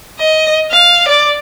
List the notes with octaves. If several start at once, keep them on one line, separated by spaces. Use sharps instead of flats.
D#5
F5
D5